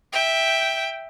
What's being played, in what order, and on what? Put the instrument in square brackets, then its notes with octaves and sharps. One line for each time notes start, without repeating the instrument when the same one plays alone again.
[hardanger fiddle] E5 [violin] G5